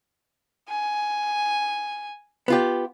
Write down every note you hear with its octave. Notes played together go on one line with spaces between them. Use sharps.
G#5
B3 F4 G4